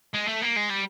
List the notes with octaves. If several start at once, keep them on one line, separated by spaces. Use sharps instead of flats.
G#3
A3
A#3
G#3
G3